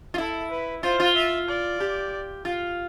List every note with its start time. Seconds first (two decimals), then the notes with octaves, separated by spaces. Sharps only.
0.14 F4
0.18 E4 A4
0.51 B4
0.83 F4 C5
1.00 F4
1.15 E5
1.48 D5
1.80 G4
2.45 F4